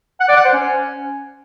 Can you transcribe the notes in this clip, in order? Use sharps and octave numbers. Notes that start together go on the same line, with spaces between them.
F#5
D5
F#5
C5
C#4